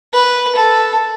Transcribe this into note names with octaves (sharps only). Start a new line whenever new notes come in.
B4
A4